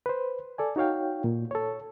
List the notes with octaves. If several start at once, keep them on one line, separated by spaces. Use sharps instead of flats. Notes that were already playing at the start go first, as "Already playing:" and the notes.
B4 C5
A4 D5 G#5
D#4 F#4 C#5 F5 G5
A#2
A4 C#5